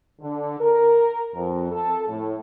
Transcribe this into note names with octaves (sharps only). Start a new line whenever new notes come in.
D3
A#4
F2
A4
A2